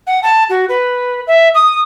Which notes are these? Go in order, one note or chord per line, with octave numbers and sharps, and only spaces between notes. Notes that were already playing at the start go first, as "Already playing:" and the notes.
F#5
A5
F#4
B4
E5
D#6